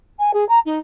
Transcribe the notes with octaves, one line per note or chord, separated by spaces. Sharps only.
G#5
G#4
A#5
D#4